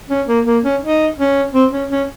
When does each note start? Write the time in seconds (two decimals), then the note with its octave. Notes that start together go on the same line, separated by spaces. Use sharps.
0.09 C#4
0.28 A#3
0.46 A#3
0.64 C#4
0.82 D#4
1.18 C#4
1.54 C4
1.72 C#4
1.90 C#4